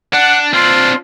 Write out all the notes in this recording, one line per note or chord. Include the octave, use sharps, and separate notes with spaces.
D4 F#5
C4 D4 F4